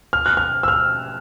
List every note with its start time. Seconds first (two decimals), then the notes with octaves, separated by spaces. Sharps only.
0.13 F6
0.26 F#6
0.37 F6
0.63 E6
0.68 F6